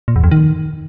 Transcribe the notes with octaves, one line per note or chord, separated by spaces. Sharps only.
A#2
E2
F2
D#3